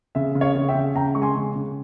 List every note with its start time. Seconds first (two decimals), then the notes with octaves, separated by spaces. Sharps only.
0.15 C#3 E5
0.35 C#3
0.41 C#5 F5
0.55 C#3
0.68 E5 G5
0.75 C#3
0.96 C#3 G5 A#5
1.15 G#3 C#6
1.22 G#5 C6
1.36 C#3
1.55 C#3